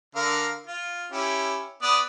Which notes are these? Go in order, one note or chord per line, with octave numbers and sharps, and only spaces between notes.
D3 A#4 F5
F4
C#4 E4 G4
B3 D5 D#6